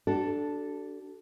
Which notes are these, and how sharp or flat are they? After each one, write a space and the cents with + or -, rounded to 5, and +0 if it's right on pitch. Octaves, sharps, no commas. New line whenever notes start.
D4 +0 F#4 +45 A4 +0